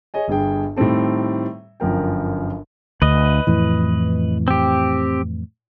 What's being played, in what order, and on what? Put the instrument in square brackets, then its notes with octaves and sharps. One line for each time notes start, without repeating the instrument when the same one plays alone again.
[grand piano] G#4 C#5 D#5 G#5
G1 G2 G#4 G5
A2 D#3 G3 C4 A4
G1 F#2 F3 A#4 G5
[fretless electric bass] D2 [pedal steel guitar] B4 D#5
[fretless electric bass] F2 A2 E3
[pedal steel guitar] C4 G4